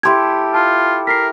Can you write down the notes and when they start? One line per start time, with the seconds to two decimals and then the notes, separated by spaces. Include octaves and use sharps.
0.03 E4 G4 A4 C6 G#6
0.54 F4 A5
1.07 A#4 B6 C7